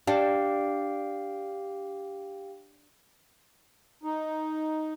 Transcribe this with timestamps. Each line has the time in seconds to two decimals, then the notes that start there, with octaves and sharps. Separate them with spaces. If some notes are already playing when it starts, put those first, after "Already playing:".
0.07 D4 G4 F5 G5
4.03 D#4